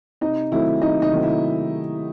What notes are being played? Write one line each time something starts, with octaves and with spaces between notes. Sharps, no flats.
C3 D#4 D#5
D#3 F#3 A3 C4 E4 E5
C3 D#4 D#5
D#4 D#5
D#3 F#3 A3 C4
E4 E5